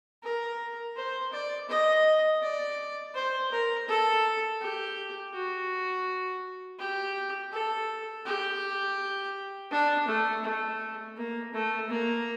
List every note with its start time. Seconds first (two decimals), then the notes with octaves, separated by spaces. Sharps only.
0.23 A#4
0.96 C5
1.32 D5
1.69 D#5
2.42 D5
3.15 C5
3.51 A#4
3.88 A4
4.61 G4
5.34 F#4
6.79 G4
7.52 A4
8.25 G4
9.71 D4
10.08 A3
10.44 A3
11.16 A#3
11.53 A3
11.89 A#3